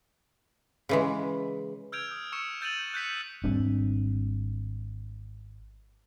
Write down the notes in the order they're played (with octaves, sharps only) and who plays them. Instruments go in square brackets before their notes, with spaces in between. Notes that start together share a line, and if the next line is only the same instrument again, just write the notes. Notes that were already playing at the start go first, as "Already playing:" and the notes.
[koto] C#3 E3 G#3
[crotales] E6 F6 G6 G#6 D7 F7
D#6
C#6 D#6 E6 C#7 E7
E6 G6 A6 D#7 F7 F#7
F#6 G6 B6 C#7
[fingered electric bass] G#1 G3 C4 D4